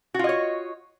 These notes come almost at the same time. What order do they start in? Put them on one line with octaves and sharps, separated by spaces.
F#4 F4 D#5 C#5